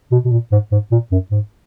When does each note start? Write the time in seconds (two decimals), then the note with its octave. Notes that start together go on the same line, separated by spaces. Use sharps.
0.12 B2
0.24 B2
0.31 A#2
0.52 G#2
0.72 G#2
0.91 A#2
1.11 F#2
1.31 G#2